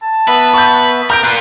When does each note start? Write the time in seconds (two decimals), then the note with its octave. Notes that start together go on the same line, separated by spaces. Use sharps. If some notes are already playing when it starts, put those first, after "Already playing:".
0.02 A5
0.28 B3 B4 E5
0.53 C#6 G6
1.10 A#4 A#5 G6 D7
1.23 A#3 F4 B4 B5